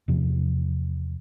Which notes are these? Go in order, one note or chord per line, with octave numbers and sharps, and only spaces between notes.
E2 C3 F3